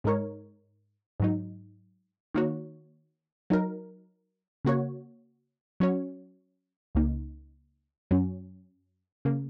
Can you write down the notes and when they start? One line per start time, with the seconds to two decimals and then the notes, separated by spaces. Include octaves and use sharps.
0.04 G#2 G#3 D#4 A#4 C#5
1.20 G#2 F#3 D#4
2.34 D#3 A#3 D#4 F#4 C#5
3.50 F#3 D#4 A#4
4.65 C#3 A#3 F#4 C#5
5.80 F#3 C#4 F#4 C#5
6.95 C#2 C#3 A#3 D#4
8.11 F#2 F#3 C#4
9.25 C#3 A#3